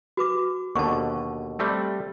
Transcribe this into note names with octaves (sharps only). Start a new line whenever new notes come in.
F#4 B4 D6
D#2 B2 D3 A5 C#6
G3 A3 C4